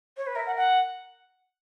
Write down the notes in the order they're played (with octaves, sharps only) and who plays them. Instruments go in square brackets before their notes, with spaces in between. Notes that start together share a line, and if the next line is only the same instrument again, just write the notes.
[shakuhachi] C#5
B4
[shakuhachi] A#4 [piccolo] E5
[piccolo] F#5
F#5